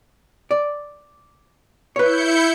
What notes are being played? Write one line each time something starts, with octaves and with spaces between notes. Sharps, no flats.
D5
E4 B4 C#5 G6 C#7